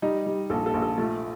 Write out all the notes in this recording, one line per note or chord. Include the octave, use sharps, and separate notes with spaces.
G3 D#4
G3
A#1 A4
A4
A#1
A4
A3 F4